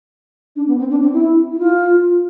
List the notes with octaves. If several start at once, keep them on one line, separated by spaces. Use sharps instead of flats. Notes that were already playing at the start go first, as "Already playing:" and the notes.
D4
B3
C4
D4
C4
E4
E4
F4